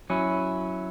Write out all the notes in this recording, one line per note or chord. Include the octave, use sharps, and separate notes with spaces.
F#3 C#4 E4